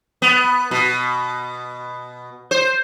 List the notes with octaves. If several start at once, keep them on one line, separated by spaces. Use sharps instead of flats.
B3
B2
C5